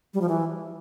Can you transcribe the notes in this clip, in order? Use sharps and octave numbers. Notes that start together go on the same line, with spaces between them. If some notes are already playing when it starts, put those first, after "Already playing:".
G3
F3
E3